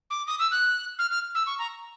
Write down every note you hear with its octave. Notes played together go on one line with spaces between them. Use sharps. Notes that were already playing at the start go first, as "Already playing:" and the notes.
D6
D#6
E6
F#6
F6
F6
E6
C#6
A#5